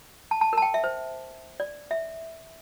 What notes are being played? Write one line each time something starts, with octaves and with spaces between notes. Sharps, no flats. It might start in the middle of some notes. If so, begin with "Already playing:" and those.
A5
A5
A#4 A5
G5
E5
C5
D5
E5